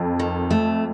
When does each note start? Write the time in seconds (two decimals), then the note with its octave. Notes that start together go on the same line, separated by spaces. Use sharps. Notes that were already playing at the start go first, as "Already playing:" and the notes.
Already playing: F2
0.19 D#3
0.51 A3